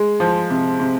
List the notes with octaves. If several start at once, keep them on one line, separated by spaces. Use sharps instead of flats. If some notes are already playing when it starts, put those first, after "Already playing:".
Already playing: G#3
F3
C3
C3